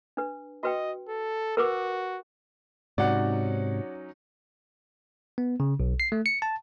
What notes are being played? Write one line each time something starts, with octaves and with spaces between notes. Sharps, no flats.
D4 B4
F#4 B4 D#5 G5
A4
F#4 A#4 B4 D6
G#2 C3 F#3 C#4 D#4 D5 F#5
B3
C#3
B1
C7
A3
C#7
A5